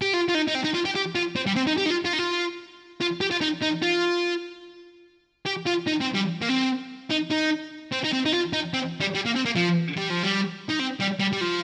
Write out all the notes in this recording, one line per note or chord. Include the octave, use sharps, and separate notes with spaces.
G4
F4
F4
D#4
D#4
C4
D#4
F4
G4
G4
F4
C4
G3
C4
D#4
G4
D#4
F4
F4
D#4
F4
F4
G4
F4
D#4
D#4
F4
G4
F4
D#4
C4
G3
A#3
C4
D#4
D#4
C4
D#4
C4
D#4
F4
D#4
C4
G3
G3
A#3
C4
A#3
F3
G3
F3
G3
D#4
C4
G3
G3
G3
F3